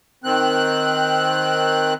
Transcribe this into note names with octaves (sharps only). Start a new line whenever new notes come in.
D#3 C4 F#6